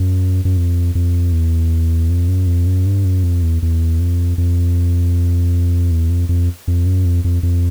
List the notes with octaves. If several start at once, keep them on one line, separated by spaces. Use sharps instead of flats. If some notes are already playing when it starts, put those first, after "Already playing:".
Already playing: F#2
F#2
F2
F2
E2
F2
F#2
F2
F#2
G2
F#2
F2
E2
E2
F2
F2
E2
F2
F2
F2
F#2
F2
F2
F2